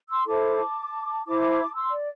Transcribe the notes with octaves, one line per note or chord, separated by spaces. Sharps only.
C6 E6
E4 A4 C5 A5 D6
E4 C5 A5 D6
C6 E6
D5